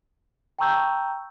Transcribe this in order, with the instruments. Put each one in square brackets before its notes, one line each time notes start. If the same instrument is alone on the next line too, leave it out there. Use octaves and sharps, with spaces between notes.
[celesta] G5 A5 A#5 C#6 E6 G6